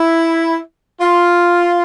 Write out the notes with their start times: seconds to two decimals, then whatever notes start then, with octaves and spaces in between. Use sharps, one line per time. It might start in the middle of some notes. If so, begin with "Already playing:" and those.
Already playing: E4
1.01 F4